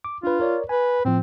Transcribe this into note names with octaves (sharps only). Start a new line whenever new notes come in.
D6
D4 F4 B4
A#4 C#5 D5
B4 G#5
A2 F3 C4